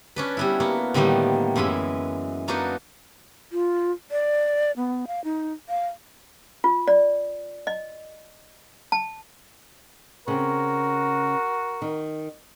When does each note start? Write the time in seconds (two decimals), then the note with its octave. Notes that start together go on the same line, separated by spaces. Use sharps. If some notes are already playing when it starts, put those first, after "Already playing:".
0.16 C#4 D4 B4
0.37 G3 B3 E4
0.60 A#3 B3 F#4
0.94 A2 D3 D#3 G3 A#3 B3
1.56 F#2 E3 G#3 E4 B5
2.48 A#3 B3 D4 D#4 F#4 B4
3.52 F4
4.11 D5
4.77 B3
5.07 F5
5.24 D#4
5.69 F5
6.64 F4
6.88 D5
7.67 D#5
8.92 A5
10.28 C#3 C4 F#4 A#4
11.82 D#3